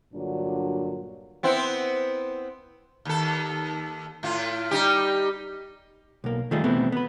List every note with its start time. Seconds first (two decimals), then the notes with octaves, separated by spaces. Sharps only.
0.14 G2 A#2 D3 F#3 D4
1.43 B3 C4 E4
3.05 D#2 A4
4.23 A2 F4
4.71 G3 D#4 G4
6.24 B1 A#3
6.51 D#3 G3 A3 D#4 F4 G#4
6.64 B2 E3 A3 B3 C4 E4
6.92 B3 B4